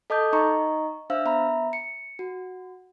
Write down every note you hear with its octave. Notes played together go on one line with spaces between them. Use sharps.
A4 D#5 A5 D6 D#6 G6
D#4 D#5 A#5 C#6
D4 C5 E5 F5 E6
B3 E5 A#5 B5
C#7
F#4